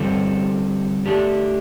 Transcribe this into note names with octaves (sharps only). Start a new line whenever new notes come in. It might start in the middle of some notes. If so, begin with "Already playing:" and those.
Already playing: D3 G3 C4 F4 A4
D3 A3 D4 G4